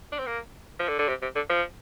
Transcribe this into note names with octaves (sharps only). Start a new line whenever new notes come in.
D4
C4
A#3
F3
D3
D3
C3
C3
D3
F3